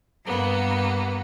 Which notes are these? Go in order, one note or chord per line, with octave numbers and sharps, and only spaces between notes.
G2 A#3 B3